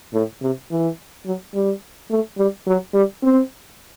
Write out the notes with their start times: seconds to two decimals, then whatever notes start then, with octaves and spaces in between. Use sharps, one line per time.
0.13 A2
0.42 C3
0.71 E3
1.25 F#3
1.54 G3
2.10 A3
2.38 G3
2.67 F#3
2.94 G3
3.23 C4